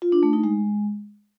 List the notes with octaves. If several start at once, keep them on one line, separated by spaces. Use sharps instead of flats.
F4
D4
A3
D#4
G#3